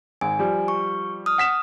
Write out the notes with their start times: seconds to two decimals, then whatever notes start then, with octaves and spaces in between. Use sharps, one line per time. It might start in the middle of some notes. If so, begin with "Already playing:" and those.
0.21 G#1 G#5
0.39 F3 G3
0.68 C#6
1.26 D#6 F6
1.38 F#5 B6 E7